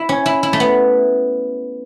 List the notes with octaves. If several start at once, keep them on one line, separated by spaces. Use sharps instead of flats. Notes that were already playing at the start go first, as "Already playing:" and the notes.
Already playing: E4
C#4
E4
E4
A3
B3